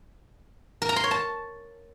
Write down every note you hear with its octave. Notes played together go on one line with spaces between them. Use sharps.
A#4
A#5
C6
C#5
A5